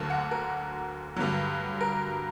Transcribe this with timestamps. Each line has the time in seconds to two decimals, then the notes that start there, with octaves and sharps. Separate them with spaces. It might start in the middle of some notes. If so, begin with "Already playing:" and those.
Already playing: D2 D3 F#3 A#3 A5
0.10 F#5
0.31 A#4
1.16 G2 D3 F#3
1.81 A#4